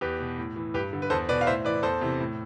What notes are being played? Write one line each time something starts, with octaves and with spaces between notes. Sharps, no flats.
E2 G4 B4
B2
A2
E3
G2 G4 B4
D3
B4
E2 A4 C5
B2 B4 D5
F5
A2 C5 E5
E3 B4 D5
E2 A4 C5
C3 E3
A2